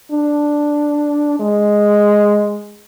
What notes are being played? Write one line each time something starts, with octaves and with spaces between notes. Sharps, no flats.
D4
G#3